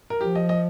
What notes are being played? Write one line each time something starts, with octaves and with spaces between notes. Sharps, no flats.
A#4
F3 G4
D#5
D#5